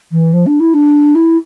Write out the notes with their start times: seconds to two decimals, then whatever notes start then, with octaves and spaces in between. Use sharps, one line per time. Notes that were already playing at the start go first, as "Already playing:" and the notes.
0.12 E3
0.33 F3
0.46 D4
0.60 E4
0.74 D4
1.15 E4